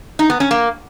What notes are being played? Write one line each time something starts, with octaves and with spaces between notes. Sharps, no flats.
D#4
B3
C#4
A#3